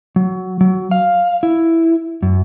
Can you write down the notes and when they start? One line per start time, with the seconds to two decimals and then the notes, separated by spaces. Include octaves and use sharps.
0.16 F#3
0.61 F#3
0.91 F5
1.43 E4
2.22 F#2